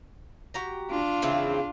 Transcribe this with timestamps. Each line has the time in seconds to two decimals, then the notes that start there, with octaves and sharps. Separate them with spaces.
0.54 F#4 G4 A#5
0.91 D4 F4
1.22 C#3 E3 C4